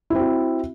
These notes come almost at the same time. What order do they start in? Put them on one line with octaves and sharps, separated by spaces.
E4 C4 F#4